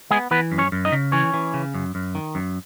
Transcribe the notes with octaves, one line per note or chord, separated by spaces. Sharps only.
G#3 B3 G#4
E3 B3 B4
F#2
C#4 C#5
F#2
D#4 D#5
C#3
E3 C#4 C#5
E3
C#3
F#2
F#2
D#3
F#2